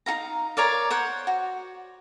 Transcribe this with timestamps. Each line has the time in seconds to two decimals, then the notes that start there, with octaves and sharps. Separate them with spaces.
0.06 D#4 F#4 F5 A#5
0.57 A#4 C#5 D5 F5
0.90 C5 C#5 F#5
1.27 F#4